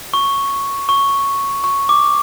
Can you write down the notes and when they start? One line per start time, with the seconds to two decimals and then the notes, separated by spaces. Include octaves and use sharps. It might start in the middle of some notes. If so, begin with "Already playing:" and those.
0.14 C#6
0.89 C#6
1.64 C#6
1.89 D6